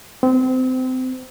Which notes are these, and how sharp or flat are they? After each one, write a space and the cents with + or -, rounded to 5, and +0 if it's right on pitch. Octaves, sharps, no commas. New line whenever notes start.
C4 -25